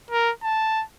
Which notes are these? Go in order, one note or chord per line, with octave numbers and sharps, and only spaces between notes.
A#4
A5